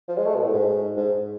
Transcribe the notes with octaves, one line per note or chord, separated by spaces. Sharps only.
F3
G#3
A3
B2
A2
G#2
G#2